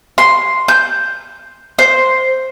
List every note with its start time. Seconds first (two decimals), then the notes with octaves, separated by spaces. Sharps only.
0.18 C6
0.68 G6
1.79 C5